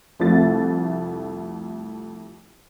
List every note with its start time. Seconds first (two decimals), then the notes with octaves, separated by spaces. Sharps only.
0.20 C2 F2 A3 A4 A6